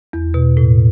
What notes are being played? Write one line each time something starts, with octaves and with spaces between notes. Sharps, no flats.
E2
B2
A2